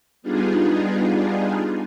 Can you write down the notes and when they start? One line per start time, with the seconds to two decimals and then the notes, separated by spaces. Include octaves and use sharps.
0.22 G3 B3 D4 D#4 F4 G#4